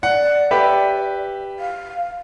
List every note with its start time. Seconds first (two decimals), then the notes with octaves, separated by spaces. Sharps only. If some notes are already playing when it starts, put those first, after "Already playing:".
0.03 D5 F#5
0.51 G4 B4 E5
1.60 F5